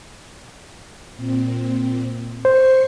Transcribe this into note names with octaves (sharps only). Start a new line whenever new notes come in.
A#2 C4
C5 C#6 C7